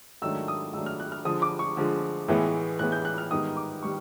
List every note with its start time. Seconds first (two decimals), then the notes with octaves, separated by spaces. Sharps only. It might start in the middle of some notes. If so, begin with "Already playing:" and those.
0.22 G#2 D#3 F#3 A3 D4 E6
0.48 D#6
0.73 G#2 D#3 F#3 A3 D4 E6
0.86 F6
1.00 F#6
1.12 F6
1.25 D3 F3 G#3 D#6
1.42 D6
1.59 C#6
1.77 D3 F3 G#3
2.28 A2 E3 G#3 B3
2.79 A2 E3 G#3 B3 F#6
2.92 G6
3.05 F#6
3.18 F6
3.31 G#2 D#3 G3 B3 D#4 D#6
3.57 D6
3.83 D#3 G3 C#6